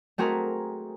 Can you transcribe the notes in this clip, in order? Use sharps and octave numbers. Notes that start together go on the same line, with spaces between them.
A3 C4 F#4 G#4 A#4